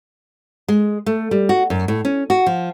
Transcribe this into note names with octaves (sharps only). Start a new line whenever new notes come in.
G#3
A3
G3
F#4
F#2
A2
C#4
F#4
F3